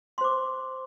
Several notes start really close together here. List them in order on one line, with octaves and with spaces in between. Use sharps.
C6 C5 D6